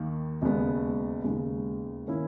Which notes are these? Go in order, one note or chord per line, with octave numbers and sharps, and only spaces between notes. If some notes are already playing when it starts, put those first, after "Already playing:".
Already playing: D#2 D#3 A#3
E1 D#2 C#3 G#3 B3
E1 D#2 C#3 G#3 D#4
D#3 A#3 C#4 E4